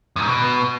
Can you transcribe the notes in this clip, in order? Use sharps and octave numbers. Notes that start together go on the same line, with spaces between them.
F#2
G#2
B2